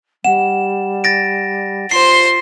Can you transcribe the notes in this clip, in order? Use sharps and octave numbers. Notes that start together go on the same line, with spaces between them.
G3 F#5 E7
A6 A#6 D7
F4 C5 C6 C7